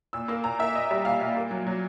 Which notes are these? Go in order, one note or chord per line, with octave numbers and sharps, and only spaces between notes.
A#2 E6
A#3 E6
A#2 A#5
A#3 E5
A#2 D#5
G3
A#2 F5
A#2
A#3
F#3
F#3